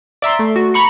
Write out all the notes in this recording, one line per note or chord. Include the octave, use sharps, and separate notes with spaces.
D5 E5 A#5 C6
A3
F#4
A#5 B5 C#6 C#7